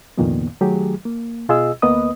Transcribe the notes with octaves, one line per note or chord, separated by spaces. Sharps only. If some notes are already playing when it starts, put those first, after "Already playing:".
C2 F2 A#2 D#3 A#3 B3
D#3 F#3 A3 G4 G#4
A#3
B2 F4 G#4 D#5 E6
D2 A#3 B3 B4 D#5 D#6